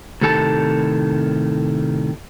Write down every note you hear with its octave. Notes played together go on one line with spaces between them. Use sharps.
A2 C3 D#3 A4 G#5 A5